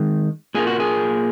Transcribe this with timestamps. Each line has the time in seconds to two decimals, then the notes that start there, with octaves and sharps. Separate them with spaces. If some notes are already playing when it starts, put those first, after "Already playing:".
Already playing: D#3 G#3
0.55 A#2 A#3 G#4
0.67 F#4
0.80 G#4